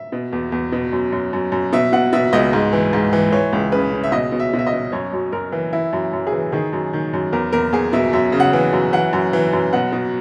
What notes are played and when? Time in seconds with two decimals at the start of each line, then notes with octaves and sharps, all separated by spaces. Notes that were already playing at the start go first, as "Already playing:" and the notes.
Already playing: E5
0.12 B2
0.33 E2
0.52 E2
0.72 B2
0.92 F#2
1.12 F#2
1.33 F#2
1.52 F#2
1.73 B2 E5
1.92 B2 F#5
2.13 B2 E5
2.33 C#2 D#5
2.53 G#2
2.73 E3
2.93 G#2
3.13 E3
3.32 E3 C#5
3.53 C#2
3.72 C#3 B4
3.93 C#3
4.04 E5
4.12 B2 D#5
4.32 B2
4.40 E5
4.53 B2
4.59 E5
4.67 D#5
4.73 B2
4.92 F#2 C#5
5.13 F#2
5.32 F#2 A#4
5.52 E3
5.73 E3 E4
5.93 F#2
6.13 F#2
6.27 G#4
6.33 E3
6.52 D#3 G#4
6.73 F#2
6.93 D#3
7.13 F#2
7.32 E2 A#4
7.53 E2 A#4
7.72 E2 G#4
7.93 B2 E5
8.13 F#2 E5
8.32 C#3
8.40 F#5
8.53 E3
8.73 F#2
8.93 E3 F#5
9.13 F#2
9.33 E3
9.53 F#2
9.73 B2 F#5
9.92 B2